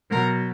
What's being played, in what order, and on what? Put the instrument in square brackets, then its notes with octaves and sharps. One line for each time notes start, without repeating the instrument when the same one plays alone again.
[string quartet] B2 A#3 A#4
F#3